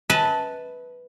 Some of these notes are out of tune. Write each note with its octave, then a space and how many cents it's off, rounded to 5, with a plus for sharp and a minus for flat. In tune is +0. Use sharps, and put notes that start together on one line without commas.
B4 +0 E5 -45 A5 +0